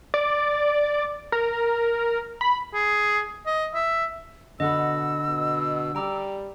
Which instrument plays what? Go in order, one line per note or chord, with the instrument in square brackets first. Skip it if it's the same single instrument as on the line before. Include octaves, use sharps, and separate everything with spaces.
[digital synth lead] D5
A#4
B5
[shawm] G#4
D#5
E5
[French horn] B2 [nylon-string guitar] D3 [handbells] D#5 F#5 B5 [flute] E6
[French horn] B2
[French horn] G3 [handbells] G5 A#5 D6